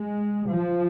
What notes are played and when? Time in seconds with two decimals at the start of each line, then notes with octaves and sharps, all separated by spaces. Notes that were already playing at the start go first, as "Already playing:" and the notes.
Already playing: G#3
0.49 F3